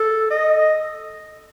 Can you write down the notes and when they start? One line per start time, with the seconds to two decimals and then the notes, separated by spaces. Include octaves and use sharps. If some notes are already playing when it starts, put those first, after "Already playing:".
Already playing: A4
0.31 D#5